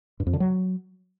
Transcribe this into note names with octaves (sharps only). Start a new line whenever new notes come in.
G2
F2
D3
F#3